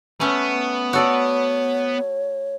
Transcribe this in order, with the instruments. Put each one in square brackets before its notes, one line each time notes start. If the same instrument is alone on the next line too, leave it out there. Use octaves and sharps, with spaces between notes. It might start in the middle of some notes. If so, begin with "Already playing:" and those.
[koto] A3 C#4 [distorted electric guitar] B3
[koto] F#4 A4 D5 [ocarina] C#5